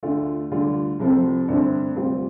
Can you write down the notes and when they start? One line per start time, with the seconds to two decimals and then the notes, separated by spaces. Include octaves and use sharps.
0.03 D2 D3 A3 F4
0.51 D2 D3 G3 F4
0.99 C2 C3 F3 C4 A4
1.48 G2 D3 A3 C4
1.96 D2 C3 G3 C4 F4